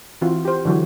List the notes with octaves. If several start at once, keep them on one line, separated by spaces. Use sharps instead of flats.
E3 C4 F4 F#4
G4 C5
D3 E3 F#3 F#4 C#5